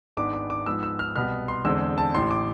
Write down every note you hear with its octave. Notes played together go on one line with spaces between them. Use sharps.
G#1 G#2 G#3 B3 D4 D6
D6
D6
G#2 F3 G#3 B3 E6
E6
F6
C2 B2 B3 F6
C6
E2 D3 G#3 C4 E6
A5
A1 A2 E3 C6
D6